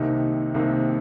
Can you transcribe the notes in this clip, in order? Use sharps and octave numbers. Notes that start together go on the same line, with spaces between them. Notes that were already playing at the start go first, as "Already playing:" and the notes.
Already playing: C2 C3 D#3 A#3 D#4
C2 C3 D#3 A#3 D#4